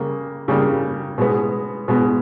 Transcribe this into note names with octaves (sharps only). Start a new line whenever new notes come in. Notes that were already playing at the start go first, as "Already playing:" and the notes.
Already playing: C#3 G3 A#3
C#3 G3 A#3
B2 G#3 B3
B2 G#3 B3